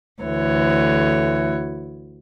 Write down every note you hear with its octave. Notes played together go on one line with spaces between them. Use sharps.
D2 E3 C#5